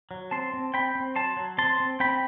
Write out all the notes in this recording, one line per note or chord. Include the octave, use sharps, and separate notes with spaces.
F#3
C4 A5 C6
C4
C4 G5 B5
C4
F#3 A5 C6
F#3
C4 A5 C6
C4
C4 G5 B5